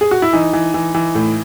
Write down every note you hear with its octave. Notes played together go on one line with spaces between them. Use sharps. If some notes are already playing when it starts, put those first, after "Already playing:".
G#4
F#4
E4
E3 D#4
E3
E3
E3
A2